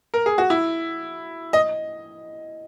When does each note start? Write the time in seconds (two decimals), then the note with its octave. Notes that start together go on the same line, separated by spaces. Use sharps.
0.14 A#4
0.26 G#4
0.38 F#4
0.50 E4
1.53 D#5